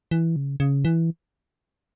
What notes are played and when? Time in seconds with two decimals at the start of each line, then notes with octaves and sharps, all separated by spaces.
0.11 E3
0.36 C#3
0.60 C#3
0.85 E3